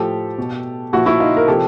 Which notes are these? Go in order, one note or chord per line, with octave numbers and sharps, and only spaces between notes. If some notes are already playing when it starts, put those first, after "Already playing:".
Already playing: A2 F3 G4 A4
B2
A#2 F3 E4 F#4
E4 F#4
D#4 F4
A#4
C3 F3 G4 A4